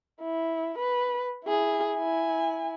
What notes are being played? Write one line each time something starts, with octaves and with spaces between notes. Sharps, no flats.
E4
B4
E4 G#4
E4 G#5